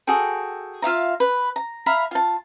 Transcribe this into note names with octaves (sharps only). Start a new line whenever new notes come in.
F#4 G#4 A4 G5
F4 E5 F5 A#5
B4
A#5
E5 F5 A#5 B5
F4 A5